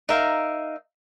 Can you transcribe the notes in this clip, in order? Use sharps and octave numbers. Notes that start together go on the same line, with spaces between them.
D#4 A#4 E5 F5